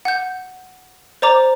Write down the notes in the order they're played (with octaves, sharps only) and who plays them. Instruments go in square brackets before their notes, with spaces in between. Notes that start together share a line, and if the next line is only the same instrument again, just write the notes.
[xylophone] F#5 G6
C5 D5 A#5 D6